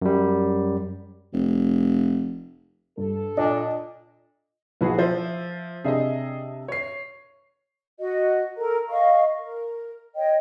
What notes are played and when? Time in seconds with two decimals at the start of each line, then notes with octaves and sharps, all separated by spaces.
0.02 F#2 G3
1.34 F1
2.97 G2 A4
3.37 A#2 D4 D#5
4.81 B1 F3 B3 E4 F#4 G#4
4.99 F3 C5 E5
5.84 C3 D4 G#4 D#5 E5
6.68 C#5 C7
7.99 F#4 D#5
8.57 A4 A#4 A#5
8.89 D#5 F5 C#6
9.41 A#4
10.15 C#5 D#5 G5